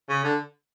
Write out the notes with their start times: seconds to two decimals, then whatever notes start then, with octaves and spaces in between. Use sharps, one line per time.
0.09 C#3
0.24 D3